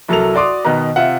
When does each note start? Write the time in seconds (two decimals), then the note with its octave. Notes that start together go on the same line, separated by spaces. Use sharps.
0.08 C2 F#3 A4 A#4 F7
0.35 F#4 D5 C6 D6 D#6
0.65 B2 D#3 B3 B4 A#5
0.96 C3 F4 E5 F#5